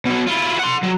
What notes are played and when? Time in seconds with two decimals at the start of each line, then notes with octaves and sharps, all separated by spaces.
0.06 B2 F#3
0.27 E4 F4
0.59 F#5 C6
0.84 F#3